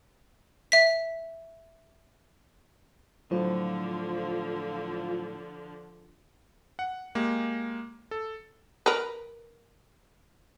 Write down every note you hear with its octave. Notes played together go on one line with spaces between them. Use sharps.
E5 B6
A2 D3 F3 F#3 F4 C5
F#5
G#3 A#3 G4
A4
A#4 B4